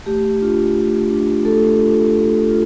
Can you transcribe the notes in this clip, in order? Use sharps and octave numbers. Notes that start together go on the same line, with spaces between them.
A3 G4
D4 F4
A3
D4 F4
A3 A4
D4 F4
A3
F4